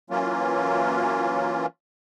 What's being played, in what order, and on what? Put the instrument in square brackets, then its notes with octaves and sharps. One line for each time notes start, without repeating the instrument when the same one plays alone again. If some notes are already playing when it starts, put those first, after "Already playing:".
[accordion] E3 F#3 A#3 C#4 F4